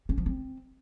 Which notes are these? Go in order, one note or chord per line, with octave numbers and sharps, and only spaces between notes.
C#4
F3
C4